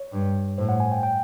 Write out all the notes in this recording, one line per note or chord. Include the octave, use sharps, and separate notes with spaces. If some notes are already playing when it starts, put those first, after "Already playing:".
Already playing: C#5
G2
A2 C5
F#5
G#5
G5
G5